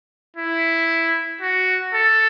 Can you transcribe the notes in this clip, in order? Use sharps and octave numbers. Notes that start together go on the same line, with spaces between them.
E4
F#4
A4